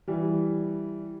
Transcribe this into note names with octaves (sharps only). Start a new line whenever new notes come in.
E3 G3